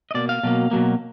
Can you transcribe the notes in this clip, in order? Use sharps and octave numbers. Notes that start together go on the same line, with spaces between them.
D#5
B2 A#3 D5
F5
B2 F#3 A#3
B2 F#3 A#3